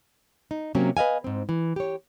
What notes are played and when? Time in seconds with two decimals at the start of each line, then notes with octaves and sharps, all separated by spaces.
0.51 D#4
0.75 C3 F#3 A#3 C4 C#4
0.97 B4 D#5 F5 G#5
1.24 G#2 C4
1.49 E3
1.76 G4 C#5